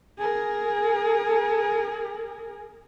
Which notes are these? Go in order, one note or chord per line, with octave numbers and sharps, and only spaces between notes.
G#4 A#4